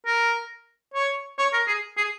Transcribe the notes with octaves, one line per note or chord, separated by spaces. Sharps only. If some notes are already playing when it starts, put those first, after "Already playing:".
A#4
C#5
C#5
A#4
G#4
G#4